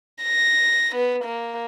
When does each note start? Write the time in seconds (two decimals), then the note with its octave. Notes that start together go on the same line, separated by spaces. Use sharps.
0.24 A#6
0.96 B3
1.25 A#3